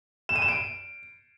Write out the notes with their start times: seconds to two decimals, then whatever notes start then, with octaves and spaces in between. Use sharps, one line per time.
0.29 E7
0.36 D#7
0.42 E7
0.48 D7